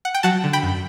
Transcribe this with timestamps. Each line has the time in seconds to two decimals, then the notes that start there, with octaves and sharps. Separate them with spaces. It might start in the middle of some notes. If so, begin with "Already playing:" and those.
0.05 F#5
0.14 G5
0.23 F#3 F#5 A5
0.44 D3
0.53 G5 B5
0.63 F#2